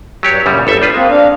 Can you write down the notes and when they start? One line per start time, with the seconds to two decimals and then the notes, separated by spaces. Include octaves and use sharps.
0.23 G2 F#3 G4 C#5
0.46 F#2 A#2 C#3 G3
0.67 G1 G2 A4 E5
0.82 G3 F4 B4
0.94 G#3 A#3 C4
1.09 D4 F5